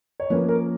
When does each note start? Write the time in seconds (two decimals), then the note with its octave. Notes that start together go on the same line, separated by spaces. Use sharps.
0.20 C#5
0.30 F3 A#3 C#4 B4
0.49 A#4